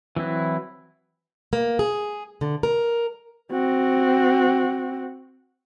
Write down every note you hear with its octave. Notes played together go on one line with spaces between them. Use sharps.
E3 F#3 C4 E4
A#3
G#4
D3
A#4
C4 F#4